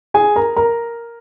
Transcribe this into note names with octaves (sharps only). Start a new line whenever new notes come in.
G#4 G#5
A#4 A#5
A#4 A#5